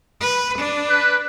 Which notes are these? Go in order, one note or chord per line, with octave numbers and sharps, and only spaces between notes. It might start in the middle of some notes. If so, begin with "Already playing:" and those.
B4
D4
B4